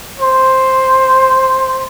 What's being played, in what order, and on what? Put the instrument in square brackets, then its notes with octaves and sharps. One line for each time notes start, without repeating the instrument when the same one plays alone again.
[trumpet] C5